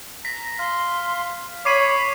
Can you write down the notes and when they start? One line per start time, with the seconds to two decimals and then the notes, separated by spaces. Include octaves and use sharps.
0.25 A#5 B6
0.59 F5 C6
1.65 C#5 B5 D6 C7 D#7